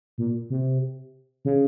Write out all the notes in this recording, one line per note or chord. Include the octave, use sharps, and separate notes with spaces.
A#2
C3
C#3